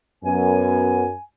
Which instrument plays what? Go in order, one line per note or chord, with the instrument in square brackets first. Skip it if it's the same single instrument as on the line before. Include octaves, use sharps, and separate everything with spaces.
[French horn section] F#2 [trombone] B3 [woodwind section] G#5